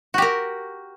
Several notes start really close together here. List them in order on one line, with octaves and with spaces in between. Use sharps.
F#4 G4 A#4